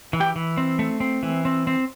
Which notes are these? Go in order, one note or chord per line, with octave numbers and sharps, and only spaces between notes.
E3
G4 G5
E3
C4
A3
C4
E3
C4
C4